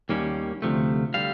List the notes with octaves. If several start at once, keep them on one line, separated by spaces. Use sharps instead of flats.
D#2 D#3 G3 A#3 C#4
D2 C3 F3 A3
D3 G3 F5